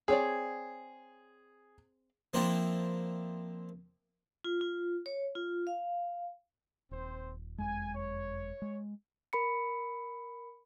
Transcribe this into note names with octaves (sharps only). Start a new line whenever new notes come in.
C4 G#4 C#5 D5
F3 A#3 C4 D4 E4
F4
F4
C#5
F4
F5
D#1 C4 C5
F#1 F2 G#3 G#5
C#5
G#3
A#4 B5 C#7